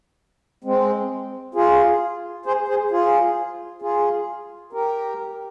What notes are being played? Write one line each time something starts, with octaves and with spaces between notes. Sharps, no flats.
G#3 C4
F4 G#4
G#4 C5
G#4 C5
F4 G#4
F4 G#4
G4 A#4